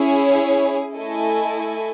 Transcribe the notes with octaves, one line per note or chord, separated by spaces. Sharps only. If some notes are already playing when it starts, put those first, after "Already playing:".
Already playing: C#4 E4 G#4 C#5
A3 E4 A4 D#5 G#5